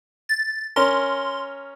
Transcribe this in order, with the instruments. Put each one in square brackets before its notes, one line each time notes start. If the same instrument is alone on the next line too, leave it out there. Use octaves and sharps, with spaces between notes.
[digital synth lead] A6
[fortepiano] C#4 A#4 [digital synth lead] C6